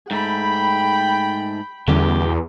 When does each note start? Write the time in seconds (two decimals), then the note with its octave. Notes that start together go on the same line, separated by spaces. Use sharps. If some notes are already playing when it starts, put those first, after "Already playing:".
0.11 G#2 A3 G5 B5
1.88 E2 B2 D3 G3 C#4 G4